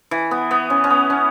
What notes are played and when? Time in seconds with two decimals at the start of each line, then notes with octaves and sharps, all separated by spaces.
0.11 E3
0.31 B3
0.51 B3
0.70 C#4
0.84 C#4
0.90 B3
1.10 C#4